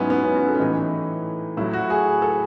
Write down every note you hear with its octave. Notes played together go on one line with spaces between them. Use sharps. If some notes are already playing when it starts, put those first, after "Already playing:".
Already playing: G#2 F#3 B3 C#4 E4
B3
C#4
F#4
A4
C#4
A2 E3 D#4
A2 F#3 E4
F#4
G#4
A4